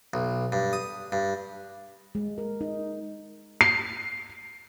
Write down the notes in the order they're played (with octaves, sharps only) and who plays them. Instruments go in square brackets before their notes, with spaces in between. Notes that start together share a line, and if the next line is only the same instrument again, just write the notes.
[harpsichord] B1
G2
D#6
G2
[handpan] G#3
A#4
D#4
[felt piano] C7